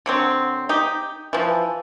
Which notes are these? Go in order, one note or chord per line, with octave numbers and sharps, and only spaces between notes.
D3 F#3 C4
D#4 G4
E3 F3